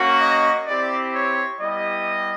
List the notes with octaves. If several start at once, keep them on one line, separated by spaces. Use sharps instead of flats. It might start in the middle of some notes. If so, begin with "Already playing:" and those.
Already playing: A#3 C#4 F#4
D#5
C4 E4 G4 D5
C#5
G3 B3 E4 G4 D#5